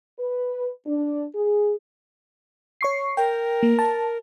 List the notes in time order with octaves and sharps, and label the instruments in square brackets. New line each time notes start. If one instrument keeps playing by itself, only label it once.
[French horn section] B4
D4
G#4
[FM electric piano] C#5 C#6 C7
[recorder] A#4 [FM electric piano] G5
[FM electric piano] A#3
A5